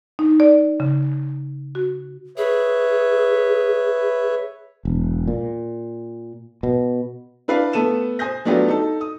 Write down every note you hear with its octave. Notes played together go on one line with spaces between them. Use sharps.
D#4
D5
C#3
F#4
G#4 B4 C#5 E5
E1
A#2
B2
D4 E4 B4 D5 F5
A3 B3 A4 D#7 E7
C5 G#5 D#6 G6 A#6
F#3 A3 B3 D4 F4 G4
D#4 A4
D#6